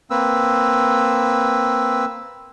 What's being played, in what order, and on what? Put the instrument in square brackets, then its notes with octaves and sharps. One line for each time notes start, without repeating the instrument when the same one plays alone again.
[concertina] A#3 C4 B4 E6